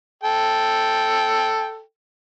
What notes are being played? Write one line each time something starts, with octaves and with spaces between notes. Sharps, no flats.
A4 G5